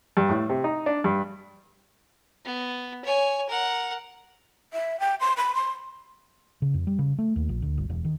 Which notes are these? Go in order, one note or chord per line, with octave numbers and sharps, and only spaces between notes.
G2
A2
C3
D#4
D4
G2
B3
C#5 G#5
A#4 F#5
E5
G5
C6
B5
C6
C#3
F2
G3
C#3
A3
D#2
A#1
D2
G1
E1
D#3